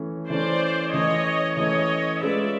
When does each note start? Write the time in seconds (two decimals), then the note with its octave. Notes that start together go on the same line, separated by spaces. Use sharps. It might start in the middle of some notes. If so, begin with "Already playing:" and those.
Already playing: E3 A3 C#4
0.29 E3 A3 C#4 C5 D5
0.93 E3 A3 C#4 C#5 D#5
1.57 E3 A3 C#4 C#5 D#5
2.21 G#3 C#4 F4 G#4 B4 D5 E5